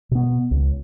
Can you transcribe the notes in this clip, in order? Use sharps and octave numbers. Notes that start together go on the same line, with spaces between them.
B2 B3
C#2